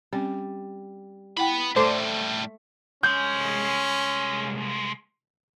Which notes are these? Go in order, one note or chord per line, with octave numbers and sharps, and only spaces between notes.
G3 C4 C#4
B3 E4 F#5 G5 B5
A2 G3 A3 A4 C5 D5 C6
C2 G#3 C#4 G6